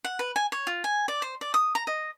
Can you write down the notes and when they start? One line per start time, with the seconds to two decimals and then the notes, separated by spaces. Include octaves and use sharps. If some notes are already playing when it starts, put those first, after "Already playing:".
0.04 F#5
0.19 B4
0.36 G#5
0.52 C#5
0.67 F4
0.84 G#5
1.08 D5
1.22 C5
1.41 D5
1.54 D#6
1.75 A#5
1.87 D#5